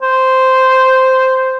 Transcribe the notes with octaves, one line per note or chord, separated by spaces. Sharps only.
C5